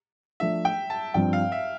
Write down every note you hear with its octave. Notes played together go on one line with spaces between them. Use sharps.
F3 A3 D4 A4 E5
G5
A5
G2 F3 C4 G5
F5
E5